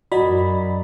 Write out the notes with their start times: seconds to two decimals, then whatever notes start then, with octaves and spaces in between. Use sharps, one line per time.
0.12 F#2 F#4 D5 D#5 A#5 B5